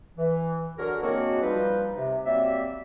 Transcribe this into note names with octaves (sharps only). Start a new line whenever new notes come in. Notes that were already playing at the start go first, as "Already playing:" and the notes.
E3
D3 F#3 F#4 G#4 A#4
F#3 G#3 A#3 C4 D4 F#4
F3 G3 D#4 B4
C3
F#3 G3 A#3 C4 D5 E5